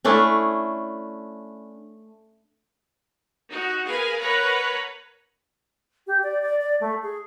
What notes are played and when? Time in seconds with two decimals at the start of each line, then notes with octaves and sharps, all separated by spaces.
0.05 A3 C#4 D4 E4
3.49 D#4 F#4
3.86 G#4 A#4 B4 F5 G#5
4.21 A#4 B4 C#5 F#5 A#5 B5
6.07 G4
6.23 D5
6.42 D5
6.61 D5
6.81 A3
7.02 G#4